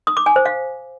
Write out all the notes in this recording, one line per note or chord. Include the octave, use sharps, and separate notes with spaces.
D#6
D6
G#5
C5
F5